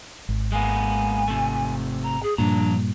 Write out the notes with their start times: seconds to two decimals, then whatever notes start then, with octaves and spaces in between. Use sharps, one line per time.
0.29 G#1
0.52 G#3 A#3 B3 G#5
1.28 C3 A3
2.03 A#5
2.22 G#4
2.38 G2 A#2 F3 D4 A#5